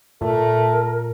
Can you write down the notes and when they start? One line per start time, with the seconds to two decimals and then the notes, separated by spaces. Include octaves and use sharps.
0.21 A#2 A3 A#4